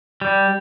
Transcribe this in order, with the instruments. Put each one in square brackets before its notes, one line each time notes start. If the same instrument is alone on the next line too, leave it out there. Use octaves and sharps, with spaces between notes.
[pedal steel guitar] G3